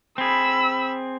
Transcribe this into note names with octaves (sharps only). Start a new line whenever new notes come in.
C4 G#4 B5 E6